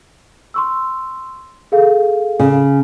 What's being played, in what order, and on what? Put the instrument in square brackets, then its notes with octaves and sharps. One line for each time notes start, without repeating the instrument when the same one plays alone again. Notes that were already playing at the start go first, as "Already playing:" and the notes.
[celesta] C6 C#6 E6
G#4 A4 F5
[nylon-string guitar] C#3